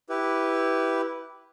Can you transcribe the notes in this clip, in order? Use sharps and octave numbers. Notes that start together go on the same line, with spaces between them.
E4 G4 B4